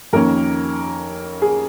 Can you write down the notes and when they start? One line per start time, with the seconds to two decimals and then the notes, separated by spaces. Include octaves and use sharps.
0.13 F2 D#3 A#3 C#4 A#4
1.42 G#4